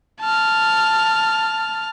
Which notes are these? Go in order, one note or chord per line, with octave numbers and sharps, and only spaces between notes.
A5 F6